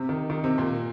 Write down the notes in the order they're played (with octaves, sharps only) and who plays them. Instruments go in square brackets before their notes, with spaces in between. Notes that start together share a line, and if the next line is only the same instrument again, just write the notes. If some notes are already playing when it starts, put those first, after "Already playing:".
Already playing: [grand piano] C3
D#3
D#3
C3
A#2